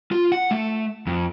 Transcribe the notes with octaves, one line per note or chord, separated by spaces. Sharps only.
F4
F#5
A3
F2